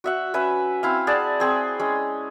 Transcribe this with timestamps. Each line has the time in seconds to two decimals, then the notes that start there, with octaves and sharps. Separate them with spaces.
0.04 F#4 E5 F#5
0.34 C#4 B4 E5
0.83 C4 E4 F5
1.07 G#4 D5 F#5 A5
1.40 C4 G#4 C6
1.80 G#3 C#4